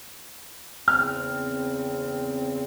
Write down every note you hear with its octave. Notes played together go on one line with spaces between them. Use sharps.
E2 C#3 C4 F6